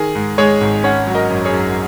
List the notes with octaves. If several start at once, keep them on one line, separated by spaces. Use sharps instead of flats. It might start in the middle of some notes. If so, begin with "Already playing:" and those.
Already playing: D#3 G#4
G#2
G#3 G#4 C#5
G#1
C#4 C#5 F#5
F#3
A#4 D#5
F#2
G#4 C#5
F#2